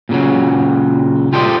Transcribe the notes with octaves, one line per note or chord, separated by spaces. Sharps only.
A#2 C#3 F#3
F4 G4 A4 C5 D5 D#5